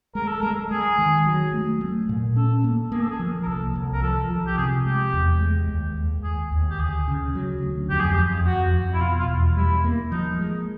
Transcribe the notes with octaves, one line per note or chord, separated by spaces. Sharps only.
G#3 A#4
A4
G#3 A#4
G#3 G#4
D#3
F#3
A3
A3
A#2
C#4 A4
A#3
A#3 G#4
A4
G#4
F3
A#4
C2 A4
C2
A#4
F3 A4
F3
G4
C3 G#4
G#3 G4
E2
G#3
D#2
D#2
D#2 G#4
D#2
G4
D2 G#4
C#3
F#3
D2
F2 G4
G#4
G4
F2
F2 F#4
F2
E4
B2 F4
F4
E2
G3 E4
A#3
F3 D#4
G#3